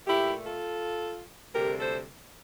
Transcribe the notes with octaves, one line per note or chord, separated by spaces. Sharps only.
A#2 A3 E4 G4
F4 A4
D2 C3 G3 G4 A#4
A4 C5